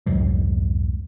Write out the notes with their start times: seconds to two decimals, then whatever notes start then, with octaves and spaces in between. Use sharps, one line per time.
0.06 C2 F2 G#2 F#3